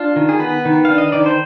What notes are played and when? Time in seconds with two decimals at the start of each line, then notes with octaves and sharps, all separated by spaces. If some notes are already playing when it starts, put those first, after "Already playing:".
Already playing: D4 F4
0.16 D#3
0.29 G#4
0.40 B3 B4
0.65 D#3
0.85 F5
0.90 D4
0.98 D#5
1.12 D#3 D5
1.26 C5